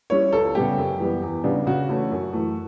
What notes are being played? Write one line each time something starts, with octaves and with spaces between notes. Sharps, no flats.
G3 C#4 E4 C#5
C#2 A4
C#3 G3 B3 G4
F#2
E3 G3 B3
E2
C#3 G3 B3 D4
C#3 F#4
E3 A3 C#4 E4
F#2
E3 A3